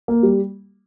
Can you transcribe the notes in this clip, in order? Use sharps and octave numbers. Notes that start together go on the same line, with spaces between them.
A#3
G3